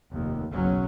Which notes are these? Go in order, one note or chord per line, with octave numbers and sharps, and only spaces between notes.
F1 D#2
F#1 B1 F#3 C#4